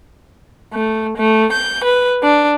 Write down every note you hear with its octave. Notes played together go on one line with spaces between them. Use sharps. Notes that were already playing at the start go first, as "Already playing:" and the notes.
A3
A3
G6
B4
D4